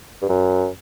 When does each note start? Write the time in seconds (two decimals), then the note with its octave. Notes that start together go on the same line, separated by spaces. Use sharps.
0.22 G2
0.29 F#2